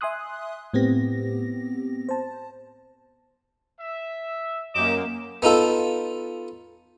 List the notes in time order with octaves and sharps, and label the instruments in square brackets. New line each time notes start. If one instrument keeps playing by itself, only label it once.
[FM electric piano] E5 G#5 C6 D#6 F#6
A2 B3 C4 G4 A#6
C5 A5
[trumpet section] E5
[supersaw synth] F#2 A#3 [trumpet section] G4 D#5 D6 [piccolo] E7
[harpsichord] B3 D#4 F4 A4